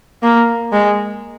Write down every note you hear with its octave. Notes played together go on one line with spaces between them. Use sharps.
A#3
G#3